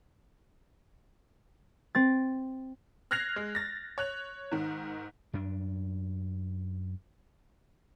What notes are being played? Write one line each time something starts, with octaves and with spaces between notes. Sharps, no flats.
C4 A6
F6 F#6 G#6 A#6 C7 F7
G#3
A6 A#6
C#5 F#6 F7
G#2 D#3
F#2 D4